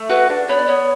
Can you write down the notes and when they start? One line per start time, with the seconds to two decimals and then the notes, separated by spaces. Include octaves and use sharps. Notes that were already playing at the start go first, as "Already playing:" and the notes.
Already playing: A3
0.09 F#4 B4
0.30 D4
0.49 B3 C#5
0.57 D5
0.66 B3 C#5